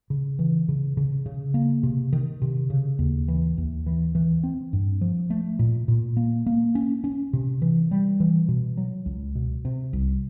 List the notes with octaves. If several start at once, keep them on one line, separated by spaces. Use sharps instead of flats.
C#3
E3
C#3
C#3
C#3
A#3
C3
D#3
C3
C#3
D#2
E3
D#2
E3
E3
C4
G2
F3
A3
A#2
A#2
A#3
A#3
C#4
C#4
C3
E3
G3
E3
B2
F#3
C#2
B2
C3
C2